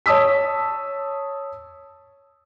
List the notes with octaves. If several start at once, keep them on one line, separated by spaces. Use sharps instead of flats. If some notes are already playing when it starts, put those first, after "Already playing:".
C#5 A5 D#6 E6 B6